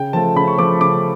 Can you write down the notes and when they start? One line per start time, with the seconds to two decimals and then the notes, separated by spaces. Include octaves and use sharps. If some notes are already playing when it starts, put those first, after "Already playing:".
Already playing: C#3 G5
0.13 F3 A3 A5
0.35 C#3 B5
0.48 C#6
0.58 F3 A3 D6
0.80 C#3 D6